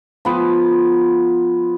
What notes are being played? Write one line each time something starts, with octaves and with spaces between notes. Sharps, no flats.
F3 B3